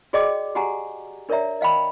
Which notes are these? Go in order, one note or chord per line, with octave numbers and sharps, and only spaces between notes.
F#4 G#4 D5 D#5 G5 D6
F#4 G4 F#5 G#5 A#5
D4 A#4 C#5 D5 E5 A#5
D#5 F5 G5 B5